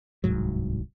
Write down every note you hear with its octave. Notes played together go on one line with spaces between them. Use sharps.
D1 C2 G#2 F#3